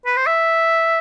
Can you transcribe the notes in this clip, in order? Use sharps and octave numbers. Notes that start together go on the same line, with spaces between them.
B4
C5
E5